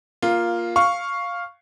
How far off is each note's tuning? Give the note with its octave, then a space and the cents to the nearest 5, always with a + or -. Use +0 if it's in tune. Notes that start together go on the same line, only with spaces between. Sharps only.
A#3 +10 F4 +0
F5 +0 C#6 +0